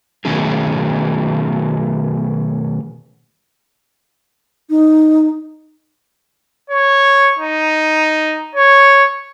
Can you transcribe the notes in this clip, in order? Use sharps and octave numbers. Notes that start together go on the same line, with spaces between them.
B2 D#3 F#3 A3 C#4 G#4
D#4
C#5
D#4
C#5